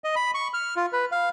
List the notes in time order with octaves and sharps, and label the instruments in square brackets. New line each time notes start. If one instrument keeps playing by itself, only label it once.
[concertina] D#5
B5
C#6
F6
F4
B4
F5